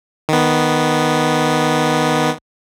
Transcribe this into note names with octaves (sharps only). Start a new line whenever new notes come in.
D#3 B3